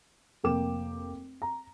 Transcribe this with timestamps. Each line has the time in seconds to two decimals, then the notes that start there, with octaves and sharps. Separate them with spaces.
0.44 F1 A#3 A#4 G5 D6 E7
1.42 A#5